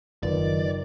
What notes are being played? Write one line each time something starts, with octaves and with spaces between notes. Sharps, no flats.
F#1 D#3 F4 A#4 B4 D5